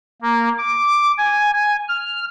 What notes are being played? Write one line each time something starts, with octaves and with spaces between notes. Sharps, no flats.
A#3
D6
G#5
G#5
F6